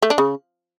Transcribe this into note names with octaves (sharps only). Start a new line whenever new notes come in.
A3
D4
C#3